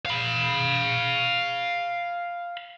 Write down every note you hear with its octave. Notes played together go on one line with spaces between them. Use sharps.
F5 B5